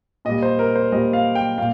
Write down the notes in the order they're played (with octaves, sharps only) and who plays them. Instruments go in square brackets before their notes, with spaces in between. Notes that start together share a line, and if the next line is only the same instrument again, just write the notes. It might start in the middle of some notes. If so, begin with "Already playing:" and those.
[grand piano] A#2 G3 D#5
C5
A#4
C5
A#2 G3 D#5
F5
G5
A#2 F5